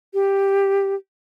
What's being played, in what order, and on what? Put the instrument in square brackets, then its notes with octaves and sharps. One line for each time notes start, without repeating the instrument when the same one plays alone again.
[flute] G4